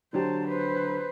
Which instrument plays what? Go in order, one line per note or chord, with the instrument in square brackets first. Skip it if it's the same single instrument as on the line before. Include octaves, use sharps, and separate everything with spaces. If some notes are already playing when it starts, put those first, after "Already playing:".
[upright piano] D3 F#3 G4 [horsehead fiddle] C5 A5
[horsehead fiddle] B4 C5